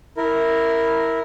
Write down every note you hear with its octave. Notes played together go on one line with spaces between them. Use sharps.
E4 A#4